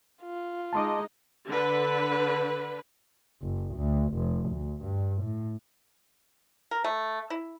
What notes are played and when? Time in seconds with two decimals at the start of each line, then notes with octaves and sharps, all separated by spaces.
0.23 F4
0.73 G#3 D#4 D#5 A5 C6 D6
1.47 D3 B4
3.42 F#1
3.75 D2
4.15 F1
4.50 D2
4.82 G2
5.22 A2
6.71 A#4
6.84 A3
7.30 E4